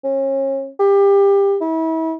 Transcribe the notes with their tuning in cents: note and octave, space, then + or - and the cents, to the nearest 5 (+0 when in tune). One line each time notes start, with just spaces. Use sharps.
C#4 -35
G4 +25
E4 -35